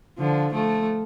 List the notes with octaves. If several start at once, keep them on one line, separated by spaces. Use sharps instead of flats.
D3 F3
F3 A3